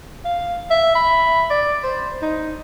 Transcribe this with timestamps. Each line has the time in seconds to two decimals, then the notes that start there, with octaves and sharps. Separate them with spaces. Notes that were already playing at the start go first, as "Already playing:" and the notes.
0.25 F5
0.70 E5
0.95 B5
1.51 D5
1.84 C5
2.22 D#4